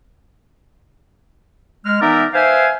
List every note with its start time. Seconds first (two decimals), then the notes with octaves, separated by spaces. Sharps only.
1.85 G#3 F6
2.02 E3 B3 D#4 A#4 D5 E5
2.34 B4 C5 E5 F5 G5 G#5